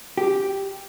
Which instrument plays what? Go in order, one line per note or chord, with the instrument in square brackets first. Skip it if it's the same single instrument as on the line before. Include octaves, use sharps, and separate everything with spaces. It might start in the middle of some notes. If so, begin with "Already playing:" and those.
[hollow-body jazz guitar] G4